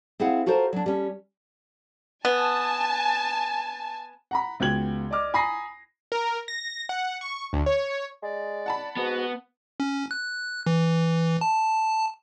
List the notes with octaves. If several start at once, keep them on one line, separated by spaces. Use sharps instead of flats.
C4 E4 G#4 F5 F#5
F4 F#4 A4 A#4 C5
F#3 D4
G3 C#4
B3 G#5 A5
F#5 A#5 B5
C#2 B3 F#4 G5 G#6 F#7
D5 D#5 D6 F6
G#5 A#5 B5 D#6 A#6 C7
A#4
A#6
F#5
C#6
D2
C#5
G#3 D5
F#5 A5 B5
G#2 B3 F#4
C#4
F#6
E3
A5